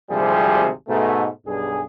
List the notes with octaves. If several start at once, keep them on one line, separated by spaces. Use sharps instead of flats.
G#1 D2 C3 F3 G3 G#4
G#2 B2 A3
B1 G2 G#4